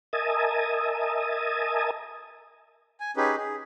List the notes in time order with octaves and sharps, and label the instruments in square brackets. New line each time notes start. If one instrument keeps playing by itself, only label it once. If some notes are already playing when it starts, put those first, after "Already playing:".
[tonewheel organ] A#4 D#5 E5 G#5 A5 D#6
[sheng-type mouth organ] G#5
C#4 D#4 G4 G#4 B4
G#4